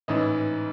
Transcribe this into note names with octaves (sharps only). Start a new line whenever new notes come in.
A1 G#2 E3 D#5